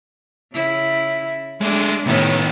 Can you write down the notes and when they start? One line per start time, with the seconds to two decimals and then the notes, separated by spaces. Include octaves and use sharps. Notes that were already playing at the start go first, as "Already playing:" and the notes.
0.53 C#3 E4
1.61 G#3 A3 D4
2.06 C2 A2 D#3 B3 C#4